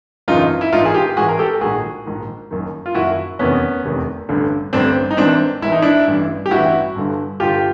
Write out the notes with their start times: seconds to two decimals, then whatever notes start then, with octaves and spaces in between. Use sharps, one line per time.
0.28 G#1 F#2 C#3 E3 D#4 F4
0.61 E4
0.72 G#1 G#2 E3 D#4 F4
0.85 G#4
0.94 F4 G4
1.16 G#1 G#2 E3 F#4 G#4
1.29 A#4
1.39 G4 A4
1.61 A#1 G#2 D#3 F#4 G#4
2.06 A#1 G#2 D#3
2.51 F#1 F#2 D#3
2.86 F4
2.95 F#1 F#2 D#3 E4 F#4
3.39 F1 E2 C3 D#3 B3 C#4
3.84 F1 E2 C3 D#3
4.29 A1 G2 D3
4.73 A1 G2 D3 C4 D4
5.11 D#4
5.17 G#1 G#2 E3 C4 D4
5.62 G#1 G#2 E3 E4
5.72 D#4
5.82 D4 E4
6.07 A1 G2 E3
6.46 G4
6.51 A1 G2 E3 E4 F#4
6.96 G1 G2 D3
7.40 G1 G2 D3 F4 G4